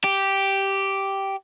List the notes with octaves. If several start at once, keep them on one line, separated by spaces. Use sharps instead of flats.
G4